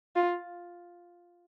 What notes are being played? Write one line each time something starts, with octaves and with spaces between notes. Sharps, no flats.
F4